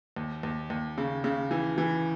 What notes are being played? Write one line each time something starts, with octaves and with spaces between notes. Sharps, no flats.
D#2
D#2
D#2
C#3
C#3
E3
E3